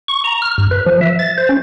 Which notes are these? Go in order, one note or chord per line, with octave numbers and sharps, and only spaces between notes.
C#6
A#5
F6
G2
B4
F3
E5
A6
C5
C#4